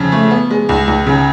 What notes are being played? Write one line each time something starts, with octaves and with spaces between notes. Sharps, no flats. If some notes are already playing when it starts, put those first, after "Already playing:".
Already playing: F2 C#3
A3
B3
G#3
C#2
C#2
C#3